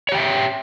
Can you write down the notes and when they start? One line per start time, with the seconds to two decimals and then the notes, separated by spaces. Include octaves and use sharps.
0.09 C#5
0.12 G4
0.15 G5
0.18 E5